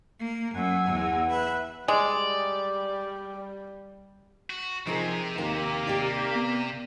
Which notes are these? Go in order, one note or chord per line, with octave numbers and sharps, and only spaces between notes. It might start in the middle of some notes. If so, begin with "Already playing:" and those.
A#3
F#2 F#5 G#5 E6
E2
B4 E5 F#6
G3 G#3 D5
F#4
C3 F3 C4 D#4 G#4 A#4
D#2 A#3 D#4
G4 D5
B3